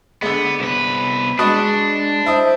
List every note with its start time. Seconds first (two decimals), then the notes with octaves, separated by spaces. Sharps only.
0.22 D3 G#3 B3
0.60 C2 B3 B4
1.39 G#3 D4 F#4 B4 D#5
2.26 E4 C5 D#5